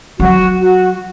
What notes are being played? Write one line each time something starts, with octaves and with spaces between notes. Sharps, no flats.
F#3 F#4
F#4